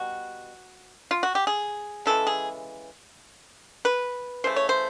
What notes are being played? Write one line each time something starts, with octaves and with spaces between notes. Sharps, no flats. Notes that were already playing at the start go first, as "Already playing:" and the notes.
Already playing: B2 G3 F#4
F4
F#4
G4
G#4
C#3 E3 G#3 A4
G#4
B4
C#3 E3 A3 C5
C#5
C5